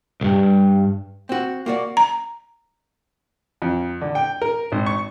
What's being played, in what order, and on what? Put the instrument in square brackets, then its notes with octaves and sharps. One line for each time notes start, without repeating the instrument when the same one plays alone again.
[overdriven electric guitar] B1 G2
[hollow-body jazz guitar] C4 F#4
A#3 F#4 D5
[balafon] A#5
[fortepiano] F2
D3
G5
A#4
G#1
C#6